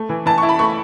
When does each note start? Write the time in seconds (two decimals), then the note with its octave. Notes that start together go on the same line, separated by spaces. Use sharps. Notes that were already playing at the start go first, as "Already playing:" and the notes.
Already playing: A3
0.09 E3
0.26 E3 A5
0.38 C#6
0.43 E4
0.49 B5
0.59 A3 C#6